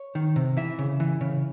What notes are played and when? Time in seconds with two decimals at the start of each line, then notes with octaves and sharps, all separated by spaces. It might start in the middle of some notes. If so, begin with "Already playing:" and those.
Already playing: C#5
0.15 D#3
0.36 C3
0.57 E3 E5
0.79 C#3
1.00 E3
1.21 C#3